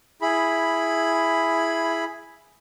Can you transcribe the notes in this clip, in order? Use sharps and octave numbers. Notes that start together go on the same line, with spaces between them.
E4 G#4 B5